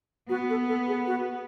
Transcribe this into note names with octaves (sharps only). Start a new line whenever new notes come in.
B3 F#4
A4
A4
G#4
F#4